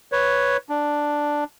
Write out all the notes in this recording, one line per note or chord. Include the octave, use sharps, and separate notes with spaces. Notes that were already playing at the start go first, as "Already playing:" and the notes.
B4 C#5
D4